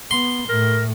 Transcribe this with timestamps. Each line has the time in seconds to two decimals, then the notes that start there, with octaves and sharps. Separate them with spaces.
0.11 B3 C6
0.49 A2 A#4